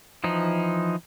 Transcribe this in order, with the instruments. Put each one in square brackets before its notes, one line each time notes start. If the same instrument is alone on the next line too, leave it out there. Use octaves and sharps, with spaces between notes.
[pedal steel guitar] E3 F3 D#4